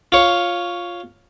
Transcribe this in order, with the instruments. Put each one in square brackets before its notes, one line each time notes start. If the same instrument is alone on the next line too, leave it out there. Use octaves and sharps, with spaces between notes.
[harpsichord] F4 C#5